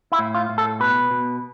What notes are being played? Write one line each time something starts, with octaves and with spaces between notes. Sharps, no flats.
E4
A2
F4
A2
A4
B2 B4
B2